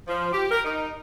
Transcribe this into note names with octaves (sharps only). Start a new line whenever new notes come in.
F3
G4
A#4
D#4